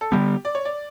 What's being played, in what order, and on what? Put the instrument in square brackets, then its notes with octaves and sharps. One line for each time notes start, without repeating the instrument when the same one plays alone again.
[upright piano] A4
[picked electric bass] D3 G3 B3 [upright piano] G4
[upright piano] D5
C#5
D5